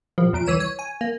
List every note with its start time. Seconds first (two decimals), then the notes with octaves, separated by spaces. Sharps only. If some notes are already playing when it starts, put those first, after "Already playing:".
0.18 A#1 F3
0.33 E2 A#2 D7
0.46 C2 E3 C#5 D#7 E7
0.60 C#5
0.79 G#5
1.01 A#3